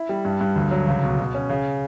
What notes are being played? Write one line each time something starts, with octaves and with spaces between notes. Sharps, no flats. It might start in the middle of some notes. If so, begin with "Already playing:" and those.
Already playing: E4
G3
G2
G2
D2
F#3
C#2
B2
B2
C#4
C#3